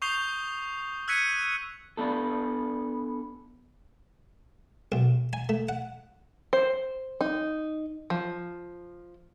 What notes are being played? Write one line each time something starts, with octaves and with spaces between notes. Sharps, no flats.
C#6 D#6 G6 C7 F7 G7
E6 F#6 G#6 B6 C#7 D#7
B3 D4 A4
B1
G#5
A3
F#5
C5
D#4
F3